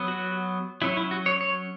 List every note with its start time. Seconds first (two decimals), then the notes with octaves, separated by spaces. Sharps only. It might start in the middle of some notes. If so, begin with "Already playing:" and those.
Already playing: F#3 B3
0.08 F#4
0.82 F#3 C#4 E4
0.97 E4
1.11 F#4
1.26 C#5
1.41 C#5